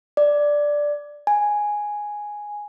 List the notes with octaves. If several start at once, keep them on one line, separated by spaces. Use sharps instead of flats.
D5
G#5